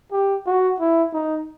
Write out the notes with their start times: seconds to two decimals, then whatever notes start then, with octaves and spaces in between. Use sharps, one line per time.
0.12 G4
0.46 F#4
0.80 E4
1.13 D#4